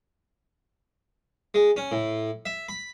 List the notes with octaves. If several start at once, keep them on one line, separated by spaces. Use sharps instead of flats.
G#3
C#4
A2
E5
B5